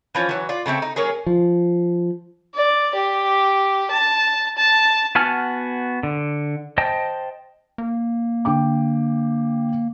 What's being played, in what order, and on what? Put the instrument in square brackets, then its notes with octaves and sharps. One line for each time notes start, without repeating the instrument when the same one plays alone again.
[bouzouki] E3 F3 C#4
E3 F#3
F4 D5
C#3 G#3 A3 C4
D#4
F#3 A#3 C#4 G#4
[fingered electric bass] F3
[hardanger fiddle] D5
G4
A5
A5
[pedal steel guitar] B3 F#4 G#5 A5 F6
D3
C5 D#5 G5 A5
[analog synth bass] A#3
[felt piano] D3 G5 D6